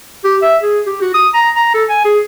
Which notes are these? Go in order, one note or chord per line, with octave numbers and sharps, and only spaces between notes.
G4
E5
G#4
G4
F#4
D#6
A#5
A#5
A4
G#5
G#4